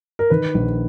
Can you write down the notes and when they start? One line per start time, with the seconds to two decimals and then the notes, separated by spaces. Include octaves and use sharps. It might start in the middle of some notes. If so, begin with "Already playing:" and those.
0.19 A#4
0.30 D#3 B4
0.54 A#1